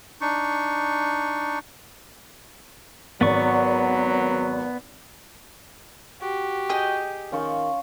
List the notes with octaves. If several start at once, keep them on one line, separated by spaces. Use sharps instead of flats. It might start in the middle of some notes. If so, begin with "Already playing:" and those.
D4 D#4 C#6
G#1 F#3 B3 D5 C#6
F#4 G4
G#4 D#5 G5
D#3 C#4 F4 C#6